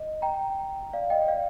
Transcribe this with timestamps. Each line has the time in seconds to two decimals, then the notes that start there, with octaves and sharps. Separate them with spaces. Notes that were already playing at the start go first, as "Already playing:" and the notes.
Already playing: D#5
0.22 G5 A#5
0.93 D5 F5
1.10 D#5 G5
1.28 D5 F5